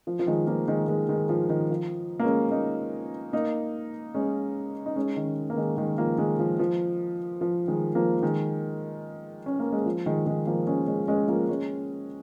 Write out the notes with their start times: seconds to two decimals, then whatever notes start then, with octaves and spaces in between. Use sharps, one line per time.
0.07 F3
0.19 F3
0.27 D#3 G#3
0.47 F3 A#3
0.68 D#3 G#3
0.88 D#3 G#3
1.09 D#3 G#3
1.29 F3
1.49 D#3
1.70 F3
2.20 A#3
2.24 G#3 C#4
2.51 A#3 D#4
3.33 A#3 D#4
4.14 G#3 C#4
4.86 D#4
4.96 G#3 C#4
5.17 D#3
5.50 A#3
5.57 D#3 G#3
5.77 D#3 G#3
5.98 F3 A#3
6.18 D#3 G#3
6.39 F3
6.59 F3
7.41 F3
7.68 D#3 G#3
7.95 F3 A#3
8.22 D#3 G#3
9.46 C#4
9.60 A#3
9.72 G#3
9.86 F3
10.06 D#3 G#3
10.26 D#3 G#3
10.47 F3 A#3
10.67 G#3 C#4
10.88 G#3 C#4
11.08 G#3 C#4
11.28 F3 A#3
11.49 G#3 C#4